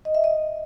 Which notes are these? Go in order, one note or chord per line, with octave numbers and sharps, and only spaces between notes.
D#5
E5
D#5